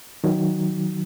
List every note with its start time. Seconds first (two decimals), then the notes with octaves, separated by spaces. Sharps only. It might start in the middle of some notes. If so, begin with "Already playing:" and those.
0.24 D#3 F#3